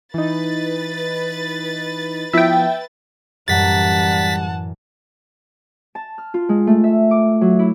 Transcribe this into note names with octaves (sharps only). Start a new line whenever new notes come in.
E3 D#4 B4 A6
F3 B3 E4 E5 G5
F#2 A2 E3 G3 F#5 A5 A6 B6
A5
F6
F4
G#3
A3
E5
D6
F#3
E4